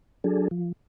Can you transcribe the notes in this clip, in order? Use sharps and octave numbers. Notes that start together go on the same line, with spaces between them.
F#3 D4 G#4 A4
F3